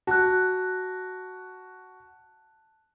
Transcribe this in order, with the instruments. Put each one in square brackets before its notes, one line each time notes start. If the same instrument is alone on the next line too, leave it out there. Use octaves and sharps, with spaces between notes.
[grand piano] F#4 [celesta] A5 F#6